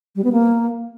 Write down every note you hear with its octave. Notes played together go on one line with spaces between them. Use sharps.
G3
B3
A#3